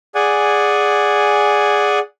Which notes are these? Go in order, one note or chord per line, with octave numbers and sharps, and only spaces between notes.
G#4 D5 F#5 G#5